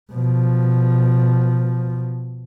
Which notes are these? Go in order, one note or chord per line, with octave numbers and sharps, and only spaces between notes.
B2 F3